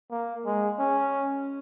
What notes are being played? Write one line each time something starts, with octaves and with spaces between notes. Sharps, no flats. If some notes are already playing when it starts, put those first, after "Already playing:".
A#3
G#3
C#4